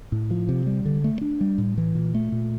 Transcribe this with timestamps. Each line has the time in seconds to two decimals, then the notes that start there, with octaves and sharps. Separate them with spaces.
0.12 A2
0.31 F3
0.49 C3
0.66 G3
0.85 D3
1.04 A3
1.21 D4
1.41 G3
1.58 A2
1.78 E3
1.95 A#2
2.15 A3
2.32 A#2